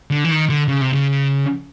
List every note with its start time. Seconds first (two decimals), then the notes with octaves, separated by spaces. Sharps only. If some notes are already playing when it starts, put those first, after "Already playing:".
0.11 D3
0.24 E3
0.31 D#3
0.49 D3
0.68 C#3
0.81 C3
0.93 C#3